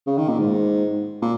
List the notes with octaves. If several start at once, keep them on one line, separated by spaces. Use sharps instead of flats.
C#3
D#3
A#2
G#2
A#2